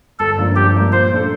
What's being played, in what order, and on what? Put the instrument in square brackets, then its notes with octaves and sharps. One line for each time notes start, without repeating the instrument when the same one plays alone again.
[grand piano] G1 [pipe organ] A4
[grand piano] G2 F3 A#3 D4
[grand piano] G1 [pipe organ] G4
[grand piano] G2 F3 A#3 D4
[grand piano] A#2 [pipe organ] C5
[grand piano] A3 D4 A4